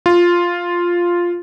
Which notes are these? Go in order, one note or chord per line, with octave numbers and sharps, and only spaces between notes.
F4